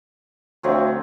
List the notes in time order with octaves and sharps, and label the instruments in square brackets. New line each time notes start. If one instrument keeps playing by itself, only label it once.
[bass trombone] D2 [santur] F3 F#3 C4